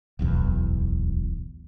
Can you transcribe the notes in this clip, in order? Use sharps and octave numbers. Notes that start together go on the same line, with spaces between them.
D1 B1 E2